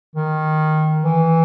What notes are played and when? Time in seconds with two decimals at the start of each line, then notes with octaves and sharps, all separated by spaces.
0.16 D#3
1.04 E3